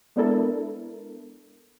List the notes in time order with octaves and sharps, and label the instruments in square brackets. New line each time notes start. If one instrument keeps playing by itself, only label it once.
[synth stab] G#3 B3 D4 E4 A4 A#4